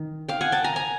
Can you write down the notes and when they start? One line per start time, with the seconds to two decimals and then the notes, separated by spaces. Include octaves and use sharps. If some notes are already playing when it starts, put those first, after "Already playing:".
Already playing: D#3
0.29 F5 G5
0.41 F#5 G#5
0.52 G5 A5
0.64 G#5 A#5
0.76 G#5 A#5